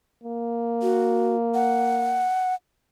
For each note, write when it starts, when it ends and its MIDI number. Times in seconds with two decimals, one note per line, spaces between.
0.24 2.28 58
0.82 1.36 66
1.54 2.55 78